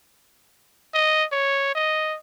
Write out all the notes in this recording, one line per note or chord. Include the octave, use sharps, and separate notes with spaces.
D#5
C#5
D#5